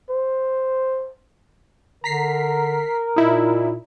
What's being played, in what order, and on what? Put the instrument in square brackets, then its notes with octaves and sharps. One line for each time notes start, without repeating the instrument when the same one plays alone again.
[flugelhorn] C5
[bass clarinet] D3 [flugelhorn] A#4 [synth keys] A#5 B6 C7
[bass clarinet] A#2 [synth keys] D#4 E4